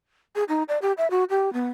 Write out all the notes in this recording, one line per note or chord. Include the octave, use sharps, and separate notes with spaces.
G#4
D#4
D5
G4
E5
F#4
G4
B3